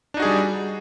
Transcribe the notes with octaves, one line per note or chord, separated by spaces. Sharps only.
G3 D4 D#4 F#4 G#4